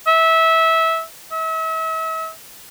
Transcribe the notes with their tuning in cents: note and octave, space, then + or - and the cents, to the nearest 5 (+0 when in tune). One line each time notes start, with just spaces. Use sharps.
E5 -20
E5 -35